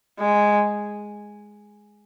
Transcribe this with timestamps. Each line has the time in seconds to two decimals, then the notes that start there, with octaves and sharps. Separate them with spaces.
0.19 G#3